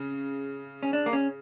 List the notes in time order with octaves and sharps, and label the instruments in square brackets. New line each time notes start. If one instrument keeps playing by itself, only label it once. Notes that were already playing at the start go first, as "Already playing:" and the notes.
Already playing: [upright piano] C#3
[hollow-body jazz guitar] C#4
D4
A#3
C#4